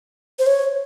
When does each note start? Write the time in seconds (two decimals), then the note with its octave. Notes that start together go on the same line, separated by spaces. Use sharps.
0.39 C5
0.46 C#5